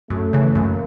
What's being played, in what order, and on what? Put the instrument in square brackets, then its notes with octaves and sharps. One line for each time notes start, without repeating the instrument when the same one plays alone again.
[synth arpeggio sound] F#2 [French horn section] A3
[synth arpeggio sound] C#3 E3
[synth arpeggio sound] F#2 [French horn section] A#3